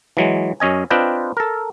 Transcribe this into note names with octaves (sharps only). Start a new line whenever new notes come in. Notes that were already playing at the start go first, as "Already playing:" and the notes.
E3 F#3 G#3
F#2 C#4 D#5 G#5
C4 D4 F4 B4 D#5 G5
A4 A#4